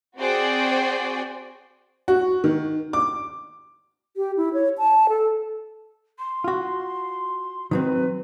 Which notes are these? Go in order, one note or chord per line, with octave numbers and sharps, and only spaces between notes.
C4 F#4 G#4 C5 D5 G5
F#4
D#3
D6
G4
E4
C#5
A5
A4
C6
F4 F#4
D#3 F#3 C4 B4